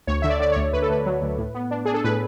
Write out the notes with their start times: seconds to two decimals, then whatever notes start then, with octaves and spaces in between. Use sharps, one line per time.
0.07 D2 C#5
0.22 D3 E5
0.30 D5
0.40 D3 D5
0.52 D2 C#5
0.73 D2 B4
0.82 A4
0.90 D2 B4
1.06 F#3
1.22 D2
1.39 A2
1.54 B3
1.71 D4
1.85 D4 G#4
1.94 A4
2.04 A2 B4